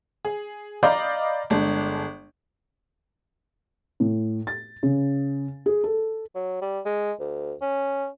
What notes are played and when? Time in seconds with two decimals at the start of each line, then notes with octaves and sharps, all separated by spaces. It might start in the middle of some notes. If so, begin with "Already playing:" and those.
0.25 G#4
0.83 D5 D#5 F5 A#5 B5 G6
1.50 G1 G#3 D4
4.00 A2
4.47 A6
4.83 C#3
5.66 G#4
5.84 A4
6.35 F#3
6.62 G3
6.85 G#3
7.20 D2
7.62 C#4